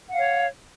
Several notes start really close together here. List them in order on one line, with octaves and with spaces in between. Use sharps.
F#5 F5 C#5